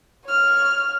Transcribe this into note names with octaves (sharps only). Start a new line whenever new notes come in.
C#5 F6